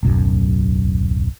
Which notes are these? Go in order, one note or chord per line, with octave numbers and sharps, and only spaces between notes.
D1 B1 F#2